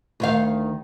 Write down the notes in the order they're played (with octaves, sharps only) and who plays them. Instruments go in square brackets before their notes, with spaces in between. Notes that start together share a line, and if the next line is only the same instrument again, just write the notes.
[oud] D2 D#3 F5